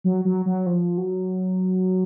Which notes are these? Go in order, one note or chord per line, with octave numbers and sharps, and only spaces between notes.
F#3
F#3
F#3
F3
F#3